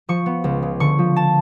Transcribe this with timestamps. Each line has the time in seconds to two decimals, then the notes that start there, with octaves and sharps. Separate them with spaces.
0.09 F3 C#6
0.26 B3
0.44 C#2
0.63 C#3
0.80 D3 C#6
0.99 F3
1.16 A5